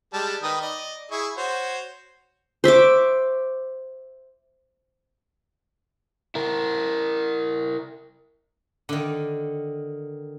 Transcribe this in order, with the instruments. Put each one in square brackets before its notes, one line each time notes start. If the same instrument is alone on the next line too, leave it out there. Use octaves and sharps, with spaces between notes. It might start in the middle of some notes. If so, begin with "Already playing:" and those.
[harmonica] G3 G#3 A5
D#3 B4 D#6
D5 D#5
E4 G#4 C#6
F#4 C5 C#5
[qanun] C5 E5 C#6 D6
[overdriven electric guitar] E4 A#4
[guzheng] D3 D#3